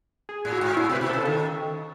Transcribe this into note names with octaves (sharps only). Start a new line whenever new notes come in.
G#4
A2
F#4
G#2
A2 E4
B2
B4
B2
C#3 A4
D#3 A4